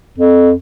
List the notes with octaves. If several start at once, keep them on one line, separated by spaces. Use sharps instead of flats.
F2